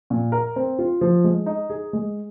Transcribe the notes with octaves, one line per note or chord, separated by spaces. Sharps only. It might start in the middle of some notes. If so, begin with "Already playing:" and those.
A#2
A#4
C4
F4
F3
G#3
D#4
G#4
G#3